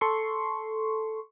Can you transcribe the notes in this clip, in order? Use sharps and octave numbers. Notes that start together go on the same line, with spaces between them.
A4 C6 C#6